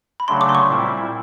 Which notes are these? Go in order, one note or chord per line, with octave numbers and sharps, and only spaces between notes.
B5
C#3 F#3 A3 D4 C6
D6
C6
C#6
A#2 G3 C4 E4